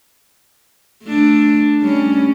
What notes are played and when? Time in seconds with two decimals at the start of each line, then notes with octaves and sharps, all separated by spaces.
1.04 A3 D4
1.82 G3 C#4